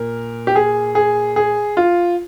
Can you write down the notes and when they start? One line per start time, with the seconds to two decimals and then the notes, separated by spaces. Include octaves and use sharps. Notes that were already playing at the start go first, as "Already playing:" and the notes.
Already playing: A#2 A#4
0.47 G4
0.56 G#4
0.95 G#4
1.36 G#4
1.77 F4